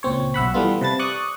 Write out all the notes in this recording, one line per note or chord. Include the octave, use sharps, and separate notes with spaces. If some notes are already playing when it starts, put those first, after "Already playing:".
C#2 A#2 C4 C#5
B1 E5 F#5 B5
E3 G3 A3 B3 F4
C3 B4 A5 A6
D5 C#6 D#6 F#6